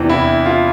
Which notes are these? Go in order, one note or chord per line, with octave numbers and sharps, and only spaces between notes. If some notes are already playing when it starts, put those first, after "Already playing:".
Already playing: E2 C3 E3 D4
E4
F4